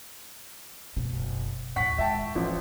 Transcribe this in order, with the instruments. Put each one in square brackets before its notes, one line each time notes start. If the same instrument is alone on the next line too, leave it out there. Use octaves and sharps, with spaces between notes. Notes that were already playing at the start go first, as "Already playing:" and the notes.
[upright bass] F#1 B2
[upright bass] D#2 A2 [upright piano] F#5 C#6 B6
[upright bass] D#3 G#3 [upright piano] E5 G5 A5
[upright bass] D1 [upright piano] A1 F3